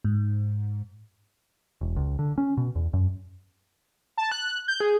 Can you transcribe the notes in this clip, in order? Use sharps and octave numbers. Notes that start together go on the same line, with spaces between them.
G#2
E1
C#2
D3
C#4
B2
E2
F#2
A5
F#6
G6
G#4